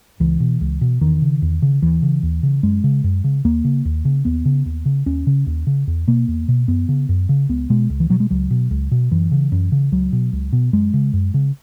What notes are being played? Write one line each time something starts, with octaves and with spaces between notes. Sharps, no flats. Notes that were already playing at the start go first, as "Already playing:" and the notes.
C#2 E3
B2
C#2
B2
E2 D#3
C#3
E2
C#3
D#2 E3
C#3
D#2
C#3
F#2 G#3
C#3
F#2
C#3
D#2 A#3
C#3
D#2
C#3
D#2 B3
C#3
D#2
C#3
D#2 C#4
C#3
D#2
C#3
E2
B2 A#3
E2
B2
F#2 B3
C#3
F#2
C#3
C#2 B3
B2 G#3
C#2
E3
B2 F#3
G#3
C#2 F#3
B2
C#2
B2
F#2 E3
C#3
F#2
C#3
C#2 F#3
B2
C#2
B2
F#2 G#3
C#3
F#2
C#3